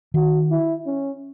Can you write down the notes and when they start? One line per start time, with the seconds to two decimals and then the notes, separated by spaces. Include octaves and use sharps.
0.14 D#3 F#4
0.51 E4
0.86 C#4